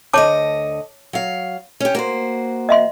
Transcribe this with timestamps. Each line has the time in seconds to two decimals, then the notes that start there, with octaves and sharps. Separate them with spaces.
0.13 D2 D3 C#5 D#5 A5 D6
1.13 F#3 F5
1.80 C#4 G4
1.95 A#3 F#4 C5
2.69 D#5 E5 C6